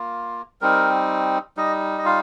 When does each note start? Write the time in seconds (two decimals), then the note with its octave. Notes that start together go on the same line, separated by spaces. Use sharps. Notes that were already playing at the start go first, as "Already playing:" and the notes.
Already playing: A#3 F4
0.61 G3 C4 D#4 A#4
1.57 G3 D#4 D#5
1.98 D#5
2.05 F4 F5